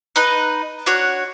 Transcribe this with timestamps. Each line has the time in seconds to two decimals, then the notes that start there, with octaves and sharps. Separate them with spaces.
0.16 D#4 B4
0.86 D4 F#4 C#5